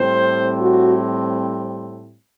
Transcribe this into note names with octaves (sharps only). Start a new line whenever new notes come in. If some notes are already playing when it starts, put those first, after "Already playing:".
Already playing: A2 G3 C4 C5
F#4